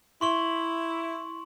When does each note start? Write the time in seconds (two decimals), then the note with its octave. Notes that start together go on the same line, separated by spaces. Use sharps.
0.21 E4 C6 C#6 F#7